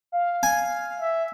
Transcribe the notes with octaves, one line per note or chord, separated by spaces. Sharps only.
F5
G#5
E5